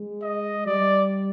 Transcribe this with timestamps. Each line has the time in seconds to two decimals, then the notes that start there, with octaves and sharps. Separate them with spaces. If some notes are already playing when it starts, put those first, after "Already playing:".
Already playing: G#3
0.22 D#5
0.66 G3 D5